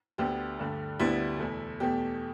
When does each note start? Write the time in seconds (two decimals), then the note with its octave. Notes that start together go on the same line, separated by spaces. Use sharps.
0.18 D2 D3 B3 G4
0.59 G2 D3 A3
0.99 D2 D3 G3 B3 E4
1.39 E2 B2 A3
1.80 E2 B2 A3 G4